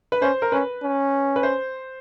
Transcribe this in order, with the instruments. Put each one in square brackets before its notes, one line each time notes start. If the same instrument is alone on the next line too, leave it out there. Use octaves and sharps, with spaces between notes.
[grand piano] B4
[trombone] C#4 [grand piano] C5
[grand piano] A#4
[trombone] C#4 [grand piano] B4
[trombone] C#4
[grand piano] B4
C5